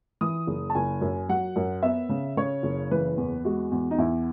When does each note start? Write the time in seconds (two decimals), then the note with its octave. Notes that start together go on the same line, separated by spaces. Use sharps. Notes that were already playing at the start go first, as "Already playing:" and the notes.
0.21 E3 D#6
0.47 F#1
0.70 A5
0.75 F#1 G#5
1.01 F#2
1.29 F#3 F#5
1.56 F#2
1.83 B3 E5
2.09 C#3
2.37 C#3 C#5
2.63 F#1
2.91 E3 B4
3.17 E2
3.45 G#3 F#4
3.71 E2
3.91 D#4
3.98 E2 E4